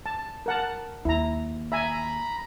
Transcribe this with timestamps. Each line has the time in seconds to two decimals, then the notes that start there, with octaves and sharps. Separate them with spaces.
0.06 A5
0.46 A#4 F#5 A5
1.05 D#2 E4 A#5
1.72 E5 G#5 A#5 B5